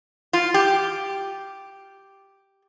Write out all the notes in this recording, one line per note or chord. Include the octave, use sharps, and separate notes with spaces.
F4
G4